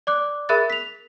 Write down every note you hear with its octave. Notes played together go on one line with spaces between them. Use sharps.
D5 D6 F#6
G#4 A#4 E5 B5 F#6 A6
B6 F7